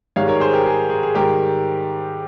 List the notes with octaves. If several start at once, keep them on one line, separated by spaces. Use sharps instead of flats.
G#2 D#3 G3 C#5 F5
A#4 C#5
G#4 C5
G4 A#4
G#4
G#4
G#4
G#2 D#3 G3 G4 A#4